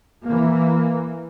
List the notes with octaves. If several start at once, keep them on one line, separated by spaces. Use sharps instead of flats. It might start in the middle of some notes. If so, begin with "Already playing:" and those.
E3 A#3